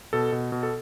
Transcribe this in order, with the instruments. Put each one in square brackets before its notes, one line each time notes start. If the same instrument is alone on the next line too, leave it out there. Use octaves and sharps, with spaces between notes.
[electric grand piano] B2 A4
B2
B2
A4